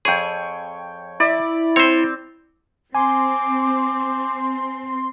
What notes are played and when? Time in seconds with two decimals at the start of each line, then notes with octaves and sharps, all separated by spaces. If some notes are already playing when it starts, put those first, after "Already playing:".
0.05 F2 G#4 C#5 G5
1.20 E4 D5
1.76 C4 C5 C#5
2.95 C4 G#5 C6 D6